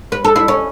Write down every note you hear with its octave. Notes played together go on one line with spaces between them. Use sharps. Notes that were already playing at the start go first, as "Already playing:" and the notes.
B4
A4
E4
C#4